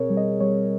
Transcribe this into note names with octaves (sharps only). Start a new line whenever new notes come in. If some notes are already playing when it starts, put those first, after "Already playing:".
Already playing: B2 C4 G#4 A#4 C#5
G3
D#5
G3 C#5